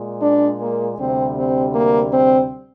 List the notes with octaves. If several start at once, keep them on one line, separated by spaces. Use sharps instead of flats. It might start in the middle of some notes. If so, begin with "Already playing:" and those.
Already playing: A#2 G#3
D4
A#3
D2 C3 G3 C4
C4
A#3
C4